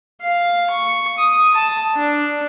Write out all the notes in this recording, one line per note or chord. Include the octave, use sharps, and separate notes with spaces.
F5
C#6
D#6
A5
D4